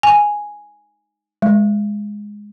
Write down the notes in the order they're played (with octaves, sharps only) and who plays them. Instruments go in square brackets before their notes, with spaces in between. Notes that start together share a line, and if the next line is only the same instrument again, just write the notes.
[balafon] G#5
G#3